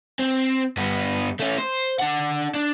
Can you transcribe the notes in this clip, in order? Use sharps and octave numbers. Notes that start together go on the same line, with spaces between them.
C4
G2 B3
A3 C#4
C5
D4 F#5
D4